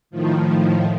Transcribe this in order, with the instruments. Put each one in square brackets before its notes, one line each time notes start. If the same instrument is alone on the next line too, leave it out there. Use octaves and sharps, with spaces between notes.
[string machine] A2 D#3 F3